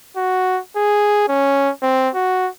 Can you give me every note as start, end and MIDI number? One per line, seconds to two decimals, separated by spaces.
0.16 0.60 66
0.76 1.25 68
1.28 1.71 61
1.82 2.09 60
2.14 2.48 66